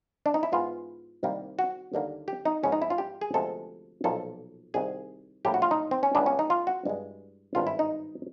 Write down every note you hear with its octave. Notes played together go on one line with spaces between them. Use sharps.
D4
D#4
E4
G#2 E3 G#3 B3 F4
C2 C3 D#3 G3 A#3
F#4
D#2 D3 G3 A#3
G4
D#4
G#2 F3 G#3 B3 C#4
D#4
E4
F4
G4
G#4
D2 C3 F3 G#3 B3 A4
B1 A#2 F3 A#3 A4
C2 C3 D#3 G#4
A#1 A2 E3 G3 A#3 G4
F#4
F4
D#4
C4
C#4
C#2 C#3 E3 G3 B3 D4
C#4
D#4
F4
F#4
G2 E3 G#3
G#1 G2 E3 F4
E4
D#4